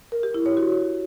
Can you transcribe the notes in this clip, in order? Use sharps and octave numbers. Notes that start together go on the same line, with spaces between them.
A#4
G4
E4
C#5
F#4